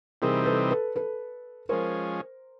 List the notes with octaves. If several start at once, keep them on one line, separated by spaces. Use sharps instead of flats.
C3 E3 G3 C4 D#4 G#4 A#4
A4 B4
A4 B4
A4 B4
F3 G#3 C#4 A#4 C5